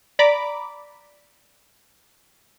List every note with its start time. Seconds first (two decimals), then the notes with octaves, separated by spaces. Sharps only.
0.19 D5 A#5 B5 D6